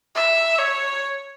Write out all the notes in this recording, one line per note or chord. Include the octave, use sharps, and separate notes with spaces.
E5
C#5